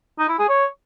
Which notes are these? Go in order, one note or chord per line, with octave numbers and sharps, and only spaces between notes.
D#4
E4
G#4
C#5